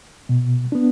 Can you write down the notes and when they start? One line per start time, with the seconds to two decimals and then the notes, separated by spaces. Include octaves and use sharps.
0.29 B2
0.72 B3 D4